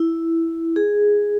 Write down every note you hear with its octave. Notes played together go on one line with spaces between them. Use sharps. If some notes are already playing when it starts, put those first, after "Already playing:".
Already playing: E4
G#4